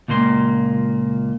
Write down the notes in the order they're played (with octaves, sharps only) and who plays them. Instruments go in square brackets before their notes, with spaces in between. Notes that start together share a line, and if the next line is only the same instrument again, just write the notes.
[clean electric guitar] C#2 A#2 A#3 C6